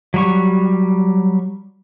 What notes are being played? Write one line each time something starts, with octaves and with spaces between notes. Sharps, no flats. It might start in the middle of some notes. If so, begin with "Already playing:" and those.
F#3 G3 C#6